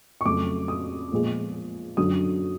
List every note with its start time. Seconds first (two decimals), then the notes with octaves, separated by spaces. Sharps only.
0.21 C#6
0.25 F2 C#3 F#3 A3 D6
0.68 D#6
1.12 A#2 F3 G#3 B3
1.97 F#2 D3 F#3 D#6